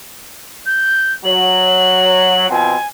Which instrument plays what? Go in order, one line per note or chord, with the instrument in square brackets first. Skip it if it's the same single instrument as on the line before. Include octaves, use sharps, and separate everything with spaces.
[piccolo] G6
[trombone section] F#3 [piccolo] F#7
[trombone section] B2 F3 C4 [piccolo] G#5